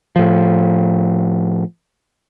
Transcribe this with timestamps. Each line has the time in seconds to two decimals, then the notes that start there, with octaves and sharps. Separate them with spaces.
0.16 A2 F3